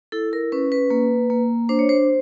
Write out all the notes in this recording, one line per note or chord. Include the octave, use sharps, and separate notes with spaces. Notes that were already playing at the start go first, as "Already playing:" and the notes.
E4 A4
A#4
C#4 B4
B4
A#3
A#3
D4 C5
C#5
C5